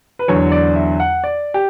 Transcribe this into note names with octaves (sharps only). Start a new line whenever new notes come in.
B4
E2 D3 F#3 C#5
D5
E5
F#5
D5
G4